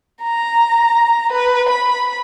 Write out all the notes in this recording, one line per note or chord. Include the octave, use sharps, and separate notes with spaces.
A#5
B4
B5